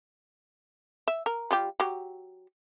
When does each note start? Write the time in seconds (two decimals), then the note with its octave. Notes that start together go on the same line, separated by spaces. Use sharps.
1.08 E5
1.26 A#4
1.51 G3 F4 G4
1.80 F#3 G4